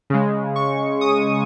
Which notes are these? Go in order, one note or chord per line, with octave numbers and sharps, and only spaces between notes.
C#3 G#3
C#6
D#6